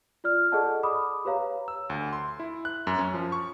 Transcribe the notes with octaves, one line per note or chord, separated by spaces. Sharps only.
F4 D5 F6
G#4 A4 D5 D#5 F#5 A5
B5 D6 D#6
G4 B4 C#5 F5 A#5
E6
D2
C6
E4
F#6
F#2
C#4
F3
C#6